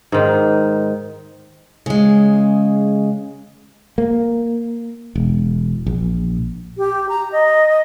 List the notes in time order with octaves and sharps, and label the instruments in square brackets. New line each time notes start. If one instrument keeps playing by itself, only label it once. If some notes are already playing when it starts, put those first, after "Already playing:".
[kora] G#2 D#3
[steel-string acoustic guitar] C#3 G#3
[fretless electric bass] A#3
E1
A#1
[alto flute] G4
A#5
D#5